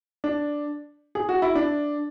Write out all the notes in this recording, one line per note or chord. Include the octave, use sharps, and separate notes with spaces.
D4
G#4
F#4
E4
D4